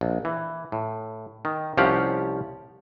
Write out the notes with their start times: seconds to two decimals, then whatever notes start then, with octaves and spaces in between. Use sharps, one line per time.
0.01 A#1
0.25 E3
0.72 A2
1.45 D#3
1.77 C2 F3 C#4 G4 F5 F#5